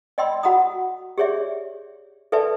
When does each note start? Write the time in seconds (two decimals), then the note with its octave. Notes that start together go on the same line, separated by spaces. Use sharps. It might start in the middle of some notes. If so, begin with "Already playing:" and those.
0.18 D5 D#5 G5 B5 C6 E6
0.43 F#4 F#5 A#5 B5 D#6
1.18 G4 G#4 C#5 D5 E5
2.32 A4 B4 D5 E5 A5